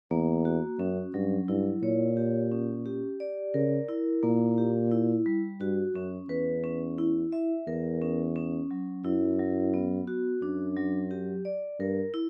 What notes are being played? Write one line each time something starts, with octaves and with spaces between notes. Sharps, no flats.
E2 A#3
F#4
F#2 C#4
G2 F#3
G2 E4
A#2 C#5
G4
C#4
G4
D5
C#3 A#4
E4
A#2 A#3
G4
E4
G3
G2 F#4
F#2 C#4
E2 B4
C#4
E4
E5
E2 A#4
C#4
C#4
F#3
F#2 E4
F#3
B3
F#4
F#2 D4
F#3
G4
D5
G2 A#4
E4